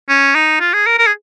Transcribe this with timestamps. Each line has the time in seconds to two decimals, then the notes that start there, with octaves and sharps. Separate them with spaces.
0.09 C#4
0.35 D#4
0.61 F4
0.74 G#4
0.87 A#4
0.99 A#4
1.07 G#4